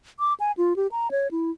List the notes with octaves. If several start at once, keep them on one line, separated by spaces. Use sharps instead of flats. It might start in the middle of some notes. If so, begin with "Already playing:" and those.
D6
G#5
F4
G4
A#5
C#5
E4